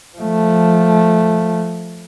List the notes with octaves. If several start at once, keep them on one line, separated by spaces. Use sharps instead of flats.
F3 A3